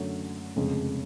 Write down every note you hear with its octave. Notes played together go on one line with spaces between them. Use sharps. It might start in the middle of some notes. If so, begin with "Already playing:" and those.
Already playing: F#2 D3 F#3 A3
F1 F2 C#3 G#3